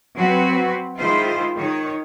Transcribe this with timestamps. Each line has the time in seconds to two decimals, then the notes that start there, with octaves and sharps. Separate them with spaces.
0.17 F#3 C4 F#4 B4
0.99 D#3 G#3 E4 F4 C5
1.55 D#3 C#5